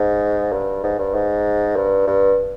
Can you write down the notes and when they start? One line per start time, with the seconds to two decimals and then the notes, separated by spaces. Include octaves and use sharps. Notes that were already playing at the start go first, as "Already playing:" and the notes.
Already playing: G#2
0.52 G2
0.84 G#2
0.99 G2
1.15 G#2
1.76 G2
2.07 G2